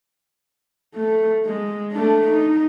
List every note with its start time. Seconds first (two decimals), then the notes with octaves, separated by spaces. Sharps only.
0.95 A3
1.46 G#3
1.92 A3 D4
2.28 D#4